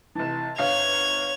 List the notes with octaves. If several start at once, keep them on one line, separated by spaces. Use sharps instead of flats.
F1 E3 A5
G1 C#5 F5 G#6 F7